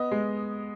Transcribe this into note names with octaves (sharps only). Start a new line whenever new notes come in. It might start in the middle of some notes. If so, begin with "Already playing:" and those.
Already playing: B3 D#5
G#3